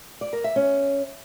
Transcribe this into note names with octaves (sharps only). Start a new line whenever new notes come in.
D5
A#4
E5
C#4